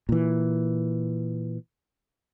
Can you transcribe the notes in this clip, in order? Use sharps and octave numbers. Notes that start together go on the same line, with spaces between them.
A#2 E3